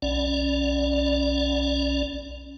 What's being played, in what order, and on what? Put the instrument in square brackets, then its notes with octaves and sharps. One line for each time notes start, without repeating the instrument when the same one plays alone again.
[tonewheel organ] B1 C#4 D5